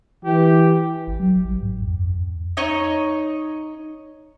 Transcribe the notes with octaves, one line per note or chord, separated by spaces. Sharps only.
E3 G4
G#1
F#3
A1
G#2
F2
F2
F2
D#4 C#5 D#5